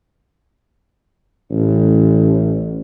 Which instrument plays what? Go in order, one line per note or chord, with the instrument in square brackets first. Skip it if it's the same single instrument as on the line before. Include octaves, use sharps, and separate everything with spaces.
[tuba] A1